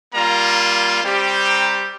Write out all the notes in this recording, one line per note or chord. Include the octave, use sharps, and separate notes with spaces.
G3 A#3 F4 A#5
G3 C4 G4
A#5